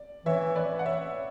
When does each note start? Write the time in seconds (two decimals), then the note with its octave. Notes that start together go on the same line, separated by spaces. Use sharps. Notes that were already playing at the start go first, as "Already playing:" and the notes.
Already playing: D5
0.26 E3 C#5 E5
0.55 B4 D5
0.79 F#5
0.86 C#5 E5